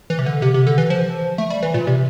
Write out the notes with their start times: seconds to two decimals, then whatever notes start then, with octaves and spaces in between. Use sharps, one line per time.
0.10 E3
0.19 C3
0.26 D3
0.42 C3
0.54 C3
0.67 D3
0.78 E3
0.90 F3
1.38 A3
1.50 G3
1.63 E3
1.74 A#2
1.87 C3